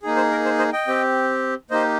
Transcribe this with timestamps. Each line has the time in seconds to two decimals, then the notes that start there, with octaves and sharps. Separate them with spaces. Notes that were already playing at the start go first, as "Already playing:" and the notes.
0.03 A#3 D#4 G#4
0.16 C5
0.31 A#4
0.45 C5
0.59 C5 D#5
0.73 D#5 G5
0.87 C4 G4
1.70 A#3 D#4 G4 C5 D#5